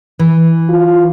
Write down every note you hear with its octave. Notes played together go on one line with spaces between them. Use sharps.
E3
F4